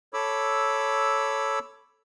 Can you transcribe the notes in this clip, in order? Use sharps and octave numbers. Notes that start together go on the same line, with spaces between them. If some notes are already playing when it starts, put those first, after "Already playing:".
A4 C#5 B5 D6 E6